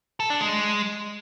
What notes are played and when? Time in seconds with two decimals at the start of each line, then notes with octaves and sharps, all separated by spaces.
0.20 A4
0.30 D4
0.41 G#3